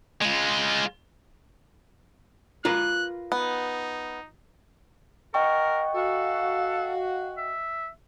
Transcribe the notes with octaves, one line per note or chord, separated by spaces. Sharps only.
G#3 F4
F4 A#4 B4 F#6
B3 D#4
A#4 D#5 F#5 G5 C#6
F#4 A4 F5
E5